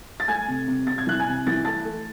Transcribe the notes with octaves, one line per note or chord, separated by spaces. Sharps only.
A6
A3 G#5 G#6
C3
C3
C3 A6
G#6
E3 F#6
G#5 G#6
C3
E3 A6
A3 A5 A6
A3